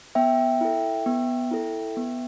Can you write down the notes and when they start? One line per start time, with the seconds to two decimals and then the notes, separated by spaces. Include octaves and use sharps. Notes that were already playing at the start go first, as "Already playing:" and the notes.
0.15 B3 E5 G5
0.61 E4 A4
1.06 B3
1.51 E4 A4
1.97 B3